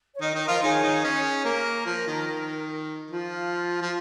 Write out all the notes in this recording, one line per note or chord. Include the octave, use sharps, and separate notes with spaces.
C#5
D#3 D#4 A#4 D#5
D#3 D#4
A#4 D#5
F3 F4
D#3 D#4 G#4 C#5
D#3 D#4
C#4
A#3 A#4
F3
D#3
D#3
F3 F4
F3